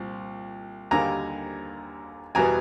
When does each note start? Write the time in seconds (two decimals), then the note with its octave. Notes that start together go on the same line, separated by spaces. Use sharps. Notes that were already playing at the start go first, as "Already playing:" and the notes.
Already playing: C2 A#2 F3
0.91 D#2 D3 G3 A#3 G#5 A#5
2.35 E2 B2 G3 B3 G#5 A#5